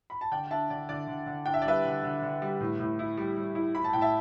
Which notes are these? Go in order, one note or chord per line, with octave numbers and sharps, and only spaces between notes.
B5
A5
D3 D5 G5
D4 E5 A5
D3 D5
D3 D5
D3
D3
D4 G5
E5
D5
G3 B4 E5
D3
D3
D3
G3
A2
A2
E4
G3
G3
E4
E4 B5
A5
A2 G5
E5 A5